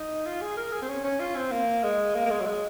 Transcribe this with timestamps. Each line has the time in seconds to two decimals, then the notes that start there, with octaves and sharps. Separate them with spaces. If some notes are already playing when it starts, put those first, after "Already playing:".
Already playing: D#4
0.26 F4
0.41 G#4
0.57 A#4
0.73 G#4
0.82 C4
0.89 C#4
1.04 C#4
1.20 F4
1.36 C4
1.52 A#3
1.83 G#3
2.15 A#3
2.26 A#3
2.30 G#3
2.41 F#3
2.46 G#3